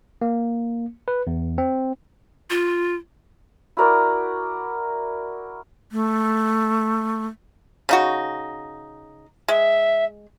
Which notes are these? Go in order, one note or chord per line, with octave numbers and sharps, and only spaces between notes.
A#3
B4
E2
C4
F4
E4 F#4 A#4 D5
A3
C#3 D#4 F#4
G#3 E5